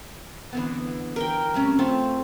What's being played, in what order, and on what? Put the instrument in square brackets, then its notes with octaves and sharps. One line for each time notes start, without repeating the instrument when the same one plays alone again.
[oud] D3 E3 B3
[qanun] A#4 G5
[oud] G3 A3 C#4
[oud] A3 F4 A4 [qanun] C4